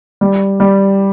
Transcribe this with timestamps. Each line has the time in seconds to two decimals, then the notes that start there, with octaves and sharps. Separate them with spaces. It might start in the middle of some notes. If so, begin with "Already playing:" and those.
0.21 G3
0.60 G3